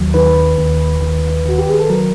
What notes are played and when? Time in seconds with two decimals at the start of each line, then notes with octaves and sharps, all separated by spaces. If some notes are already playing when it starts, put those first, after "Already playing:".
Already playing: D#2 F#3
0.14 D#3 B4
0.58 D#2
1.02 D#3
1.45 D#3 F#4
1.58 G4
1.69 G#4
1.79 A4
1.89 F#3 A#4